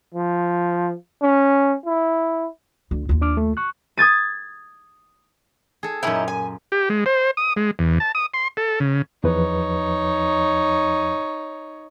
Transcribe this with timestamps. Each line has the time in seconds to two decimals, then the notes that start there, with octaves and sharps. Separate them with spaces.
0.14 F3
1.22 C#4
1.86 E4
2.91 D2
3.09 D#2 F4
3.21 D4 D6 F6
3.37 A3
3.57 C#6 F#6
3.98 D#6 G#6 A6 D#7
5.83 G#4 A4
6.03 F#2 A#2 C#4 D#4 E4
6.28 G#5
6.72 G4
6.90 G#3
7.06 C5
7.37 D#6
7.57 G#3
7.79 E2
8.00 A5
8.15 D#6
8.34 C6
8.57 A4
8.80 C#3
9.24 E2 F3 D#4 B4 C#5